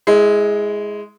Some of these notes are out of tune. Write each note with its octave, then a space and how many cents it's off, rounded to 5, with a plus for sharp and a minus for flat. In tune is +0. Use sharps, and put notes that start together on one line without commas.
G#3 +0 E4 -25